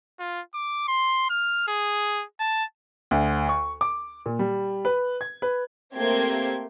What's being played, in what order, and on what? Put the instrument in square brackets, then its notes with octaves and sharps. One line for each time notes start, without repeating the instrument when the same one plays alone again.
[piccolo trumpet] F4
D6
C6
F6
G#4
A5
[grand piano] D2
C#6
D6
A#2
G3
B4
G#6
B4
[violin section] A3 A#3 C4 G4 C6 G#6